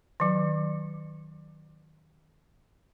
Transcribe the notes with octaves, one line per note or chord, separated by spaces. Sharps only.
D#3 F#3